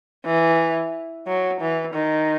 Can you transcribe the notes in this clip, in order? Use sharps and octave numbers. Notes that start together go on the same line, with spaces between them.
E3
F#3
E3
D#3